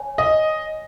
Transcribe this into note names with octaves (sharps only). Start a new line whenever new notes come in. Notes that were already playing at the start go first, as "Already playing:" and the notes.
Already playing: C#5 G#5
D#5